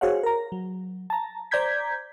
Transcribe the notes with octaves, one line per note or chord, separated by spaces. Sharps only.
F#4 G#4 C5 C#5 F5 F#5
A#4 A#5
F#3
A5 A#5
C5 D5 A#5 G6 G#6 B6